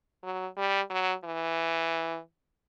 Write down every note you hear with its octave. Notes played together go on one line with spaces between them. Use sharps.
F#3
G3
F#3
E3